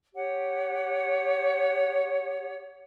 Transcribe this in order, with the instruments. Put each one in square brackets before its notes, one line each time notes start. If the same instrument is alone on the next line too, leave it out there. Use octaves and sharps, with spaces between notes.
[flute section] G4 C#5 F#5